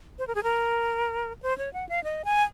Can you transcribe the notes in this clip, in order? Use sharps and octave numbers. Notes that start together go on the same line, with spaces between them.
C5
A#4
G#4
A#4
C5
C#5
F#5
F5
D#5
G#5